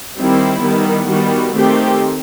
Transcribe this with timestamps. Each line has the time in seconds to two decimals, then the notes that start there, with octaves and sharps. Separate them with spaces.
0.18 D#3 G3 C4 E4
0.64 D#3 G3 B3
1.09 D#3 G3 B3 F#4
1.55 D#3 A3 C4 G4